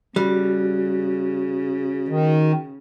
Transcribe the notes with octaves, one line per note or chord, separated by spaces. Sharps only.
C#3 G3 F#4
D#3